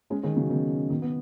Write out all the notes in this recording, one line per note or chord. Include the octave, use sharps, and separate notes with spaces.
G#3 C#4
D#3 G#3
C#3 F#3
B2 D#3
B2 D#3
B3